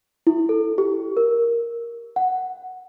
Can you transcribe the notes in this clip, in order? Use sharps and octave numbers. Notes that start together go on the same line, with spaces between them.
E4
A4
G4
A#4
F#5